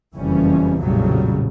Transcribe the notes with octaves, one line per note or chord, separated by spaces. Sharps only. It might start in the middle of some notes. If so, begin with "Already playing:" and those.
F#1 F2 E3 G3 C#4
A#1 F2 A2 C#3 F#3 G3